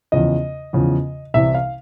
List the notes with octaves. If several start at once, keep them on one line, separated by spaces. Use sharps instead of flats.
E2 C#3 F3 D#5
E2 C#3 F3
C2 C3 E3 E5
F5